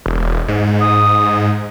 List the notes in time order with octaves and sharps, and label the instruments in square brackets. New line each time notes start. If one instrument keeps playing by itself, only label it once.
[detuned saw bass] E1
G#2
[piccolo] D#6